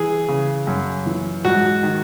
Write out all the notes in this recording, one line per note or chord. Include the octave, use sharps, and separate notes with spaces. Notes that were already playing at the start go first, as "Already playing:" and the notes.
Already playing: E3 G#4
C#3
F#2
E3
G#2 F#4
D#3